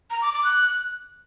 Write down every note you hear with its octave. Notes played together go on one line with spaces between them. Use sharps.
A#5
D6
D6
F#6